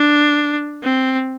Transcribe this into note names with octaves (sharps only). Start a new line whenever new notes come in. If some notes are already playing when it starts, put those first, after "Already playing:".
Already playing: D4
C4